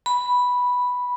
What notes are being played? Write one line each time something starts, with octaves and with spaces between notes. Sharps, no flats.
B5